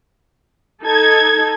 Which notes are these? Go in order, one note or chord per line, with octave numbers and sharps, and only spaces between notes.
D#4 A4 G#6